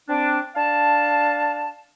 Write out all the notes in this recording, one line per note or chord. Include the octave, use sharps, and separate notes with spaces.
C4 D4
D4 F5 A5